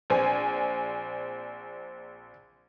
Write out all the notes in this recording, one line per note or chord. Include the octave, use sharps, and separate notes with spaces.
A#1 C4 G#5